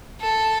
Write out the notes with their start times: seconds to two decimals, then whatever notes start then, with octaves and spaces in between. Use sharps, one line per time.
0.21 A4